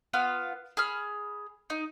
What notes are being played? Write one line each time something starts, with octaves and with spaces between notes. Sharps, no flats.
B3 F4 F5
G#4 B5 F6
D#4